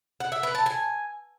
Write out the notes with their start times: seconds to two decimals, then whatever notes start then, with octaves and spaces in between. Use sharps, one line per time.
0.20 F#5
0.32 E5
0.43 B4
0.55 A5
0.66 G#5